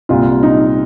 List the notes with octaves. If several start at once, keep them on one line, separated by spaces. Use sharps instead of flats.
C2 A#2 F4
D#4